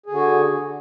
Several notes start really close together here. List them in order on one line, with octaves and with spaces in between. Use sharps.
G#4 D3 F#4